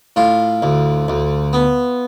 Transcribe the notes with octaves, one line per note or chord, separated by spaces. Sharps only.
A2 F4
D2
D2
B3